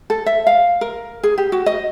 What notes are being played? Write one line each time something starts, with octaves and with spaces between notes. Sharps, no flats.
A4
E5
F5
A#4
G#4
G4
F#4
D#5